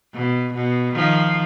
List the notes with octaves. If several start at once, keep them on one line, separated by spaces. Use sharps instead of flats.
B2
B2
D#3 F3